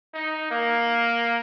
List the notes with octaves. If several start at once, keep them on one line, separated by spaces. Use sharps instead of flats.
D#4
A#3